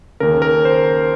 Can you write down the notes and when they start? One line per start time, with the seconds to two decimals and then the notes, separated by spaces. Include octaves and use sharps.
0.20 D#2 C#3 A#4
0.42 A#4
0.65 C5